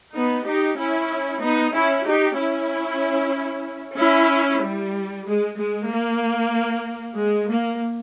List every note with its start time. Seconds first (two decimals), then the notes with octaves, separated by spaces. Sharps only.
0.14 B3 D#4
0.46 D#4 G4
0.78 C#4 E4
1.42 B3 D#4
1.74 C#4 E4
2.06 D#4 G4
2.37 C#4 E4
3.97 C#4 E4
4.61 G3
5.25 G#3
5.57 G#3
5.88 A#3
7.16 G#3
7.48 A#3